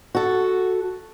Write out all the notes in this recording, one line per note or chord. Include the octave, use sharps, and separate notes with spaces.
F#4 A4